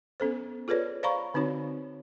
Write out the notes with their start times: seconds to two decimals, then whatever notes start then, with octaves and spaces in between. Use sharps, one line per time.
0.20 B3 C#4 A4 C5
0.68 F4 G#4 A4 B4 C#5 D5
1.03 C5 D5 F5 A#5 B5 C#6
1.34 D3 C4 D#4 F#4 C#5